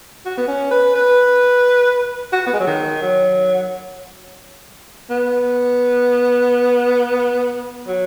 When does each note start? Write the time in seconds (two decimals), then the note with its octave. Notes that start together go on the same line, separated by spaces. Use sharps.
0.25 F#4
0.38 B3
0.48 C#4
0.71 B4
0.95 B4
2.33 F#4
2.47 B3
2.53 G#3
2.60 F#3
2.67 D#3
3.02 F#3
5.10 B3
7.87 F#3